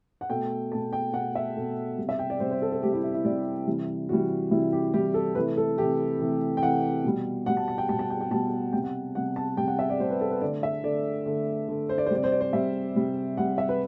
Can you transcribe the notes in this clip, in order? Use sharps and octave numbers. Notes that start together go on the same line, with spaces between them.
F#5
B2 A3 G5
B2 A3 A5
G5
B2 A3 F#5
E5
B2 A3
C3 G3
E5
G5
D5
C3 G3 C5
C5
A4
A4
C3 G3 G4
E4
E4
E4
C3 G3 D5
C3 E3 G3
C3 E3 G3 F#4
C3 E3 G3 E4
G4
C3 E3 G3 G4
A4
C3 E3 A3 B4
A4
C3 E3 A3 G4
C3 E3 A3
G5
C3 E3 A3 F#5
B2 G3
B2 G3 F#5
A5
A5
G5
B2 G3 A5
A5
G5
G5
B2 G3 A5
C3 G3 G5
F#5
C3 G3 F#5
A5
C3 G3 G5
F#5
E5
D5
C3 G3 C5
B4
A4
B4
D3 A3 D5
E5
D3 A3 D5
D3 A3
D3 A3
C5
D5
C5
C3 G3 D5
C5
D5
C5
C3 G3 E5
C3 G3
C3 G3 F#5
E5
B4